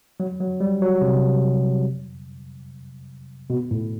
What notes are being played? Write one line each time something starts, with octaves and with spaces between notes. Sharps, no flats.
F#3
F#3
G3
F#3
C3
B2
A2